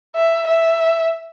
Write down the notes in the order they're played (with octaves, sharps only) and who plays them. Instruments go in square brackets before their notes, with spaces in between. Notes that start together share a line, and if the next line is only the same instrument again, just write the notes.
[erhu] E5
E5